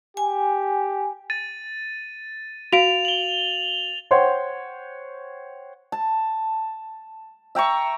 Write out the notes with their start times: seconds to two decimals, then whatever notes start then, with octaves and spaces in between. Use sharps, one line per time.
0.17 G4 G#5
1.30 A6 D#7
2.73 F#4 F5 D7 F7
3.05 F#7 G7
4.11 C5 C#5 F#5 G5 C6
5.92 A5
7.55 E5 G5 A#5 C#6